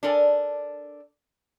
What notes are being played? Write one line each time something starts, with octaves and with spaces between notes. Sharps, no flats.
D4 A4 A#4 D5 G#5